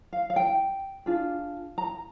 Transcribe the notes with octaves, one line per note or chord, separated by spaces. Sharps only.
F5
F5
G5
D4 F4 G#4
A#5